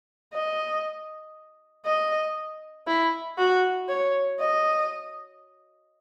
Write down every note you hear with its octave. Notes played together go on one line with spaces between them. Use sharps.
D#5
D#5
E4
F#4
C#5
D#5